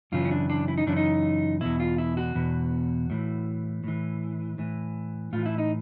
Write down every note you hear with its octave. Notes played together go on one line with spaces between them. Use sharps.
F#2 C#3 E3 F4
C#4
D4
D4
E4
D#4
F#2 C#3 E3 D4
D#4
E2 B2 E4
F4
E4
F#4
E2 B2
A2 E3
A2 E3
A2 E3
A2 E3 F4
E4
D#4